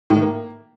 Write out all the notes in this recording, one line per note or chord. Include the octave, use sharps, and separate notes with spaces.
A2
D#3
A#3